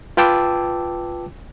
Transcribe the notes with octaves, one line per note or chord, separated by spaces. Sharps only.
F4 B4 G5 A5 D6 E6